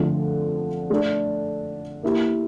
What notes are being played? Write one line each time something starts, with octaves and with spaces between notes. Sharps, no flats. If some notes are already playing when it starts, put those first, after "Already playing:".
Already playing: D3 F3 A3 C4
A3 D4 A4
A#3 E4 G4